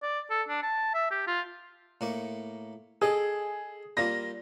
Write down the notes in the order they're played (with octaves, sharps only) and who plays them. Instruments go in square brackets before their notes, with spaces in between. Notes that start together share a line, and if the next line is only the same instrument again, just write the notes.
[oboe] D5
A4
D4
A5
E5
G4
F4
[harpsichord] A2 A#3 C#6
[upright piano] G#4 [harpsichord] A4 D#5 G5
[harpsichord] G3 A#3 F4 [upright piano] A#6